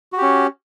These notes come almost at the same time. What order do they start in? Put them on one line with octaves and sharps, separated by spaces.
F#4 G4 C#4